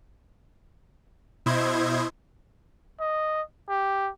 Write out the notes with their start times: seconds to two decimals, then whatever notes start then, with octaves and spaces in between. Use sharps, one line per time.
1.46 B2 E4 C5 D#5 G#6
3.00 D#5
3.69 G4